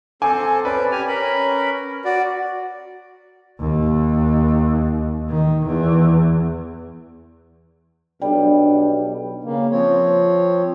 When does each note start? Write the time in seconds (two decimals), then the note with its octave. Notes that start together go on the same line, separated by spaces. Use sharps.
0.22 C4 A4 C5 G#5 D6
0.65 C#4 B4 D5
0.91 G4 G#5 F6
1.08 C#4 A#4 B5
2.05 F#4 D5
3.60 D#2
5.29 D#3
5.66 E2
8.21 B1 G3 D4
9.44 C#3 A#3
9.71 F3 C4 C#5